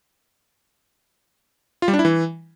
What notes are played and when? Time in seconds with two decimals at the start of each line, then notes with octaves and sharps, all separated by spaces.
1.82 F4
1.88 G3
1.93 D4
1.99 E4
2.05 E3